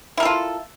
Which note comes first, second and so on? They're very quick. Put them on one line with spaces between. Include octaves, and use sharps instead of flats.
E4 A#4 A4 F4